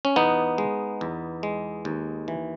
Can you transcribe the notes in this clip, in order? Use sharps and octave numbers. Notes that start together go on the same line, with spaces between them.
C#4
E2 B3 D#4
G#3
E2
G#3
D#2
E3